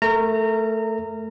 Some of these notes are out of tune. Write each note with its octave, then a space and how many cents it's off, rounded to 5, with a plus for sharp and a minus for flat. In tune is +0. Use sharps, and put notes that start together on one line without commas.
A3 +0 A#4 -20 A#5 -25